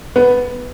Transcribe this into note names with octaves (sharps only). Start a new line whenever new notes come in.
B3